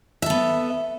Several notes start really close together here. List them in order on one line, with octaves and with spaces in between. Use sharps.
E5 A4 B3